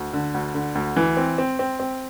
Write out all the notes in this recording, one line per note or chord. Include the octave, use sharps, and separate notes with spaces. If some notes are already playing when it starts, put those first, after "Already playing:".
Already playing: D2
D3
D2
D3
D2
E3
C4
C4
C4
C4